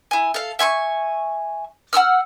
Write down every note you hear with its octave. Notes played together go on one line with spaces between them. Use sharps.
E4 G#5
A4 F5
E5 G#5 C6 C#6
F#5 A5 E6 F6